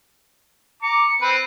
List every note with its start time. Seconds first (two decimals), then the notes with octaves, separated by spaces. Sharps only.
0.82 A#5 D6 C#7
1.22 C4 B4